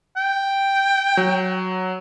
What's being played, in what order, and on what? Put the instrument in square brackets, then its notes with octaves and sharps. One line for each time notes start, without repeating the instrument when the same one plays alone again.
[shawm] G5
[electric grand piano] F#3